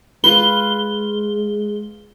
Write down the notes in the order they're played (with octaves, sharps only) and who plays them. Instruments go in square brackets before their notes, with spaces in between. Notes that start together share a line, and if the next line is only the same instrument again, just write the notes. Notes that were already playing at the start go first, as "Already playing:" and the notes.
[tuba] G#3 [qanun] F4 B4 [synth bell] G7